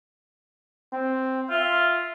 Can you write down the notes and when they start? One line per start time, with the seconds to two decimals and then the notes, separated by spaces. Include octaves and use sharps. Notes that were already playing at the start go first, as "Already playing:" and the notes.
0.93 C4
1.50 F4 E5